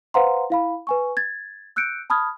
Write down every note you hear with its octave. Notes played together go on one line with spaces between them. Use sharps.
B4 C5 F5 F#5 A#5 C6
E4 F5 B5
B4 G#5 C#6
G#6 A6
E6 F#6 G6 C#7 D7
A5 B5 D#6 F6 G#6